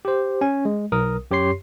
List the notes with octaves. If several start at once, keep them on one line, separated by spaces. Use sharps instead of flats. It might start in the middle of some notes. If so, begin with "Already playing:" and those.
G4 C5
C#4 G#5
G#3
B1 A#4 D#6
F#2 G4 C#5 C6 C7